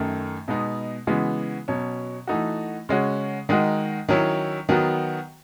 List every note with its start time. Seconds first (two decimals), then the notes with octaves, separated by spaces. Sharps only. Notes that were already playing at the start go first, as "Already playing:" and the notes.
Already playing: F#2 D#3 A3
0.48 B2 G#3 B3 D#4
1.07 C#3 E3 G#3 B3 F#4
1.68 B2 F#3 C#4
2.27 E3 A3 D#4 F#4
2.89 C#3 G#3 C#4 F#4
3.49 D#3 G#3 D#4 F#4
4.09 D#3 F#3 C#4 E4
4.69 D#3 F#3 B3 F#4